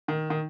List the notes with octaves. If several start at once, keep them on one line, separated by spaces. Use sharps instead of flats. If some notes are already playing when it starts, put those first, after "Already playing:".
D#3
D#3